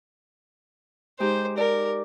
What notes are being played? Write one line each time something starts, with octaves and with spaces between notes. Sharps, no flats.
G#3 D#4 G4 C5
A#4 D5